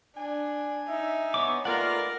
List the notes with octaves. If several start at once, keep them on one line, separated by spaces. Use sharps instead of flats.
D4 G#5
D#4 E5
B3 C#5 D6
A3 A#3 F4 A#4 B4 D5 F#5